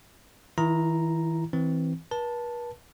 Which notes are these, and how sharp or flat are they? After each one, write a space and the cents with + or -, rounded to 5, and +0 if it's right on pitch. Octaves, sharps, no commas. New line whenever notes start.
E3 -45 E4 +20 A#5 +0
E3 -15 C4 +0
B4 -45 A5 +0